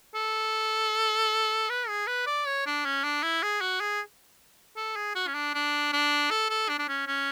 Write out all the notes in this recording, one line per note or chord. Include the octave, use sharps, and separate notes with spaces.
A4
B4
G#4
B4
D5
C#5
D4
C#4
D4
E4
G#4
F#4
G#4
A4
G#4
F#4
C#4
D4
D4
D4
A4
A4
D4
D4
C#4
C#4